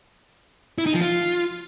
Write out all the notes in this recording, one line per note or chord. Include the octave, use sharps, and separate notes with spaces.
E4
D#4
F3
F4